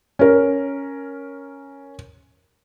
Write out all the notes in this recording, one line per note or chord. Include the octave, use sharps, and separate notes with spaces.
C#4 A#4